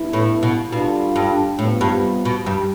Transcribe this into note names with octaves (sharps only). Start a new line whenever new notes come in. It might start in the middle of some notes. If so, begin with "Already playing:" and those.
Already playing: G2 E3 B3 E4
A2
B2
B2 D3 G3 D4 F4
G2
A2 C3 G3 B3 F4
G2
B2
G2